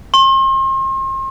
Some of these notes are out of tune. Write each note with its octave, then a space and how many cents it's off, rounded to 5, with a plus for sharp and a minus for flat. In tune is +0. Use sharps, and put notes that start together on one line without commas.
C6 +40